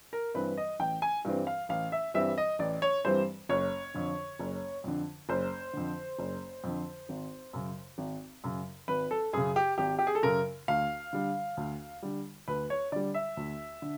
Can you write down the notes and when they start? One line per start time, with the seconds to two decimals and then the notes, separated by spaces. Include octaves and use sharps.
0.13 A#4
0.35 G2 E3 G3 C4 B4
0.57 D#5
0.80 A1 G5
1.02 G#5
1.25 G2 E3 G3 C4
1.47 F5
1.69 A1 F5
1.92 E5
2.14 G2 E3 G3 C4 E5
2.38 D#5
2.59 A1 D5
2.82 C#5
3.05 G2 E3 G3 C4 C5
3.49 F#1 C#5
3.94 F2 D3
4.40 F#1
4.84 F2 D3
5.29 F#1 C5
5.73 F2 D3
6.19 F#1
6.64 F2 D3
7.09 G#1
7.53 F#2 C#3
7.98 G#1
8.44 F#2 C#3
8.88 G#1 B4
9.11 A4
9.33 F#2 C#3 G#4
9.56 G4
9.78 G#1 G4
9.99 G4
10.07 G#4
10.15 A4
10.23 F#2 C#3 A#4
10.68 D2 F5
11.13 D3 G3
11.57 D2
12.02 D3 G3
12.48 D2 B4
12.70 C#5
12.92 D3 G3 D5
13.14 E5
13.37 D2
13.82 D3